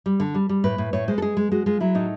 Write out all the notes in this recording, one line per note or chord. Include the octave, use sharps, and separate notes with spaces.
G3
D3
G3
G3
A2 B4
A2
A2 C#5
G#3 C5
A4
G#3 G#4
G#3
G#3 F#4
G#3 F4
F#3 E4
A2 D#4